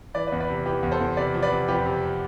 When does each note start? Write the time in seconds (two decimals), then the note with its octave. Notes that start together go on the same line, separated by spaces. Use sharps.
0.14 E3 B4 D5
0.27 B4 D5
0.32 E2
0.40 B4 D5
0.49 C3
0.66 E3 G4 B4
0.83 E2
0.92 A4 C5
1.00 E2
1.17 C3 B4 D5
1.34 F3
1.43 B4 D5
1.51 C3
1.68 F2 G4 B4
1.86 C3